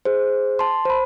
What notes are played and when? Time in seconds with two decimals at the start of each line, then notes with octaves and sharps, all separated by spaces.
0.05 G#4 C5
0.59 A5 C6
0.85 C5 B5